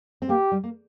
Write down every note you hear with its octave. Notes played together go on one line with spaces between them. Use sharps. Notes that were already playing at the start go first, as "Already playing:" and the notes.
C4
A#3 G4
G3
A#3